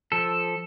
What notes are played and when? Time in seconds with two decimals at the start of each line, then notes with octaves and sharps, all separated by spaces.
0.12 F3 A4